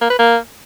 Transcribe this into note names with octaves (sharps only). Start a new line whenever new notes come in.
A#3
B4
A#3